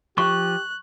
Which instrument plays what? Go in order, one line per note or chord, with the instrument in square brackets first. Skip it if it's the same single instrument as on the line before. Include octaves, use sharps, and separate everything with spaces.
[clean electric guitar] F3 [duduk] G4 [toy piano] C#6 [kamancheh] F#6